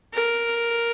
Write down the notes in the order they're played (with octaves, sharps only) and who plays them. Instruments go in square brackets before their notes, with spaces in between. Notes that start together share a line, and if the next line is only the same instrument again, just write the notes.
[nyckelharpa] A#4